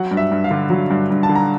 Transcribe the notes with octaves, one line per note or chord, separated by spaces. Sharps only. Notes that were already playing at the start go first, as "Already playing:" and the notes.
Already playing: F#3 F#5
G2
E5
G2
F5
D3
F#3
G2
G2
A5
D3
A#5